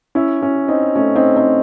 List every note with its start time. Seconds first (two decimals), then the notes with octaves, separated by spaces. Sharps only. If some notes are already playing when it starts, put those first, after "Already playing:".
0.15 C#4 E4
0.41 C#4 E4
0.68 C4 D#4
0.96 A3 C#4
1.15 C4 D#4
1.36 C4 D#4